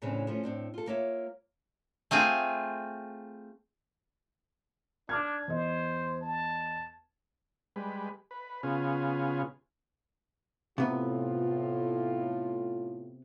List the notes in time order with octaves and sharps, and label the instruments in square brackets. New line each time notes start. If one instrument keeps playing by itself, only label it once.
[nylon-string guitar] A2 C#3 E3 C4 D4
F3 A3 C#4
A2 C4 D4
F4 A4
A#3 F4 C#5 E5
[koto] A3 C4 F4 G#4
[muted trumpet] D4 [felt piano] D6 F6 G#6
[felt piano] E2 D#5 [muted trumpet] C5
[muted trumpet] A5
[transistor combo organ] G3 G#3 B4
B4
C#3 B3 F4 G#4
[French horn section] A2 F4 [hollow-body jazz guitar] C3 B3 B4